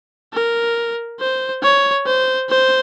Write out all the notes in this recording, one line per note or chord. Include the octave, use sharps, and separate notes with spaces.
A#4
C5
C#5
C5
C5